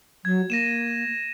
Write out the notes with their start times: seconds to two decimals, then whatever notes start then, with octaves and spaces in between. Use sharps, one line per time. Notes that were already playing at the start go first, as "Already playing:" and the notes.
0.25 F#3 G#6
0.50 A#3 A#6 D#7 E7